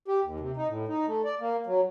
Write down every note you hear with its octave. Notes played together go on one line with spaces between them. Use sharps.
G4
D#2
C3
D#4
A2
D#4
A3
D5
A#3
F#3